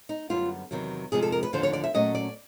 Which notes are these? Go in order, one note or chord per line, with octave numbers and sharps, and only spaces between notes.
D#4
F#2 D3 G3 B3 F4
E2 C3 D#3 F#3
F2 C3 F3 G#3 C4 G#4
A4
A#4
B4
D#2 D3 F3 C5
C#5
D5
E5
A#2 F#3 A3 C#4 D#5
D5